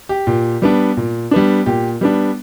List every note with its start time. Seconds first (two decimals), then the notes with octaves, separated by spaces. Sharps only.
0.09 G4
0.27 A#2
0.62 G3 B3 D4
0.97 A#2
1.31 G3 B3 D4
1.66 A#2 G4
2.01 G3 B3 D4